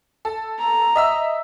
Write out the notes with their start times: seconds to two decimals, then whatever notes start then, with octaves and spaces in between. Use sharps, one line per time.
0.25 A4
0.59 A#5
0.96 D#5 E5 E6